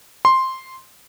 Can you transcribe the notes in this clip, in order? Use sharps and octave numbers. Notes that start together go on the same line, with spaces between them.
C6